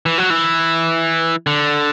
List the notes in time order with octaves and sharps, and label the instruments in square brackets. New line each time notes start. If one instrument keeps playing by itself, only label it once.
[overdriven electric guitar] E3
F#3
E3
D3